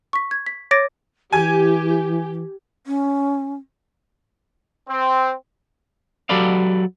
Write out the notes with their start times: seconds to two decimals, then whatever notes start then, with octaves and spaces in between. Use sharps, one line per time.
0.13 C#6 B6
0.31 G#6
0.46 B6
0.71 C#5 D6 A6 A#6 D7
1.32 E3 G4 G#5 G#6
2.87 C#4
4.89 C4
6.29 F#3 G4 A4 B4 D5 F5